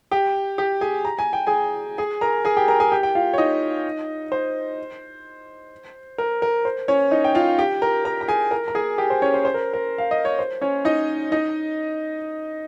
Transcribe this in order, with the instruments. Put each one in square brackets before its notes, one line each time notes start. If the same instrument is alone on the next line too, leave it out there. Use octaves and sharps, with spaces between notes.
[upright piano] G4 G5
G4 G5
G#4 G#5
A#5
G#5
G5
G#4 G#5
G#4 G#5
A#4 A#5
G#4 G#5
G4 G5
A#4 A#5
G#4 G#5
G4 G5
G5
F4 F5
C#5
D#4 D#5
C5
A#4
A#4
C5
C#4 C#5
D#4 D#5
G5
F4 F5
G4 G5
A#4 A#5
A#4 A#5
A#5
G#4 G#5
A#4 A#5
A#5
G#4 G#5
G4 G5
C5
C#4 C#5
C5
C5
A#4
A#4
F5
D#5
C#5
C5
C#4 C#5
D#4 D#5
D#4 D#5